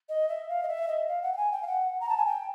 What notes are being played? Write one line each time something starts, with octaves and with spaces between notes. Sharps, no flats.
D#5
E5
F5
D#5
E5
D#5
F5
F#5
G5
G#5
G5
F5
F#5
A#5
A5
G#5
G5